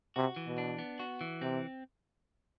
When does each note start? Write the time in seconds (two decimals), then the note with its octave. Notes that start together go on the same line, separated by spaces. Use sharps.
0.16 C3 F#4
0.36 E3
0.47 B2
0.58 D4
0.79 B3
0.99 F#4
1.21 E3
1.41 C3 C4